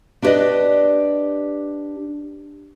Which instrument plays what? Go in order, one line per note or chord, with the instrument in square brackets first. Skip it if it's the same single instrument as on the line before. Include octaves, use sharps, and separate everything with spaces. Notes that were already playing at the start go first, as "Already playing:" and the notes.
[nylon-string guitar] D4 E4 G4 B4 D5 D#5